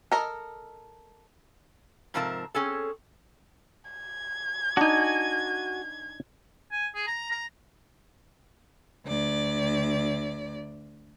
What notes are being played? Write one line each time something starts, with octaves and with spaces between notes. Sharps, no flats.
A4 A#4 D#5
G#2 C3 F3 C4 A#4 A5
C4 C#4 G#4 A4
G#6
D4 D#4 F#4 G#5
G#5
G#4
A#5
A#5
D2 D5